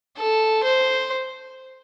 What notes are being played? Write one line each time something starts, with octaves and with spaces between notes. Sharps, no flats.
A4
C5